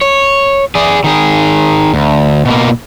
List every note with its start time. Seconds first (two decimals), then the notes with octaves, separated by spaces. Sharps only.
0.01 C#5
0.75 G#4 D5
1.04 D#3 G#4
1.94 D2
2.45 B2 A#3